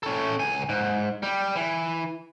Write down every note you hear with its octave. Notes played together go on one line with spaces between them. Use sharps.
C#4 A4
C#2 G#5
G#2
G3
E3